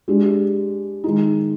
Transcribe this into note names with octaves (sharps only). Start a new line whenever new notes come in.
G#3 D4 G4
D#3 G#3 D#4